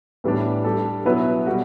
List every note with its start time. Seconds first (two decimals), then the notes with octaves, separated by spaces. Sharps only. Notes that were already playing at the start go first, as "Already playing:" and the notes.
0.24 A2 E3 G3 B3 D4
0.65 G3 D4 A4
1.05 B2 F#3 B3 E4 B4
1.46 B2 G3 B3 F#4